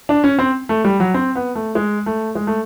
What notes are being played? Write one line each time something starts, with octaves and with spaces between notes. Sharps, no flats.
D4
C#4
C4
A3
G3
F#3
C4
B3
A3
G#3
A3
G#3
A3